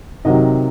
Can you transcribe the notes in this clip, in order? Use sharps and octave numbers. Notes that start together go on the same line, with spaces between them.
C3 D#3 F#3 D#5